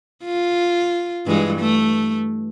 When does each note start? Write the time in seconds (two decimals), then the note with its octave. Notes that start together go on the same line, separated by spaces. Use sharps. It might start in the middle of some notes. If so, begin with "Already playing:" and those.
0.24 F4
1.26 G2 E3 G#3
1.59 A3